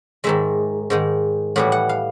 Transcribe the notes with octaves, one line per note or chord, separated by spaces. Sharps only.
G#2 D#3 G#3 E5
G#2 D#3 G#3
A2 E3 G3 F#5
F#5
F5